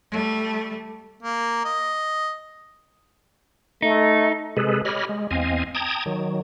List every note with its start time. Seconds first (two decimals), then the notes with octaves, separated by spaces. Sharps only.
0.11 G3 A3
1.23 A#3
1.65 D#5
3.82 A3 D#4
4.57 C3 G#3 G#4 A4 B4
4.85 G4 C#5 D#5 B5 F6
5.09 G#3
5.31 E2 C4 D#5 F5 G#5
5.75 G5 A5 A#5 D#6 G#6
6.06 D#3 F#3